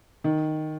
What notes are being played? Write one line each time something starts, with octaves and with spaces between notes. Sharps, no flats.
D#3